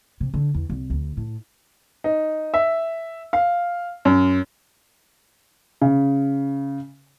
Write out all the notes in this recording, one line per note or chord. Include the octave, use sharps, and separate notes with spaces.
C3
D3
E2
C2
D2
A2
D#4
E5
F5
F#2
C#3